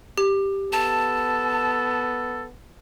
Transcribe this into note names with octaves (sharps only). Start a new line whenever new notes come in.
G4
B3 A4 A5